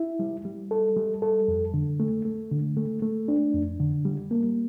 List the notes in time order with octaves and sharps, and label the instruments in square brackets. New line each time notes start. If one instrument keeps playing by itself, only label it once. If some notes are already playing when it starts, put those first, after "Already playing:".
Already playing: [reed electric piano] E4
G3
G3
A4
G3
A4
F2
D3
A3
A3
D3
A3
A3
D4
F2
D3
G3
A#3